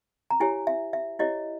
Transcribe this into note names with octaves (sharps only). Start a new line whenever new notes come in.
A#5
E4 G4 C#5 G#5
E5
E5
E4 G4 C#5 D#5